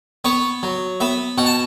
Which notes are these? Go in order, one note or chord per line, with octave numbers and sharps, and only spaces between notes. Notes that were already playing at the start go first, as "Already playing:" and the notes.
B3 C#5
F#3
B3 E5
B2 F#5
A5